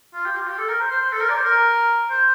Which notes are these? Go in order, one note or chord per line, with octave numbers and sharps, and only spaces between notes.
F4
G4
F4
G4
A4
A#4
C5
C5
C5
A4
A#4
D5
C5
A#4
C5